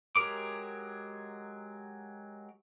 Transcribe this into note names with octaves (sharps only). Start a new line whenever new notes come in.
F#3 G#3 G4 A#4 D6